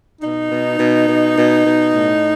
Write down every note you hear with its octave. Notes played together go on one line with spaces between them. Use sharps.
B2 D#4
B2
B2
B2
B2
B2
A2